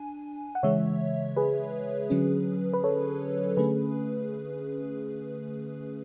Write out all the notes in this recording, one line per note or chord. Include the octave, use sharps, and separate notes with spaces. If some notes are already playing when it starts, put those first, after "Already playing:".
Already playing: D4 G#5
F#5
C#3 E3 G#3 C#5 E5
G#4 B4
D3 F#3 C#4
B4
A4 C#5
D3 A3 C#4 G#4 B4